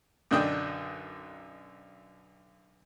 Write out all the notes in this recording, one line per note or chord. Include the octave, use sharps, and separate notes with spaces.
B1 F#2 D3 D4 D#5 G5